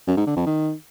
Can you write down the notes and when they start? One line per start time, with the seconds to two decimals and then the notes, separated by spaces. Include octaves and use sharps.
0.07 F#2
0.17 G#2
0.26 D3
0.36 F2
0.46 D#3